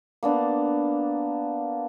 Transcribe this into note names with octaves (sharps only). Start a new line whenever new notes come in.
A#3 B3 D4